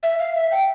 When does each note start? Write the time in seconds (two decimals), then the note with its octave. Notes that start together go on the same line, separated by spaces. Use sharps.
0.03 E5
0.19 F5
0.35 E5
0.52 G5